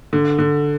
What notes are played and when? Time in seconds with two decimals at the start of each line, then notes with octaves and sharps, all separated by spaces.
0.13 D3
0.39 D3